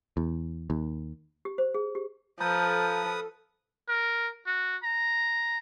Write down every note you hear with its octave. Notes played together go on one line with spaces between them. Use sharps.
E2
D#2
G4
C5
G#4
G4
F3 A4 B4 A5 A#5 D#6 G6
A#4
F#4
A#5